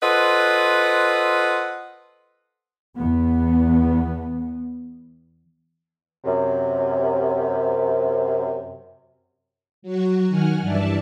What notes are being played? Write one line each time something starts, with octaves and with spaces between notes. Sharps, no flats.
F4 A4 B4 C5 D#5 F#5
E2 B3
F#2 C3
F#3 F#4
D#3 F#5 G#5 F6
G2 E3 D5 E5 A5